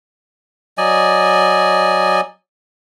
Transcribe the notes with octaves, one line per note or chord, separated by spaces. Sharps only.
F#3 D5 D#5 G#5